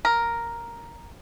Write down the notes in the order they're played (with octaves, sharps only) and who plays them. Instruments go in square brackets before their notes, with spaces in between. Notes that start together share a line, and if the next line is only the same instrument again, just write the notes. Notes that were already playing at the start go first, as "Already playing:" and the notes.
[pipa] A#4